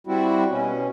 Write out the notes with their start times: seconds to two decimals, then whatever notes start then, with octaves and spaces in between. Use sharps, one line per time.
0.07 G3 C4 E4 F#4
0.50 B2 C#4